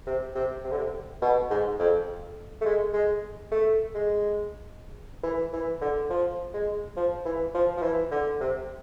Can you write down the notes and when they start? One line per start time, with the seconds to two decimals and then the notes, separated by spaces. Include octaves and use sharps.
0.07 C3
0.35 C3
0.64 C3
0.71 D3
0.78 C3
1.22 B2
1.50 G#2
1.79 F2
2.61 A3
2.66 G#3
2.93 G#3
3.51 A3
3.94 G#3
5.23 E3
5.53 E3
5.81 D3
6.10 F3
6.53 G#3
6.96 F3
7.25 E3
7.54 F3
7.77 F3
7.82 E3
8.11 D3
8.40 C3